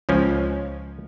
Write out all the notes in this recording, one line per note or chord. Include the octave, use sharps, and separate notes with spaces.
C#2 F3 C#4